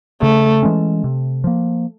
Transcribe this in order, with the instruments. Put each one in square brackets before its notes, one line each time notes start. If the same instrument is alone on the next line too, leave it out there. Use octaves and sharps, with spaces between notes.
[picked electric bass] C#3 [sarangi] A3
[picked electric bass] E3 G#3 C#4
C3
F3 A#3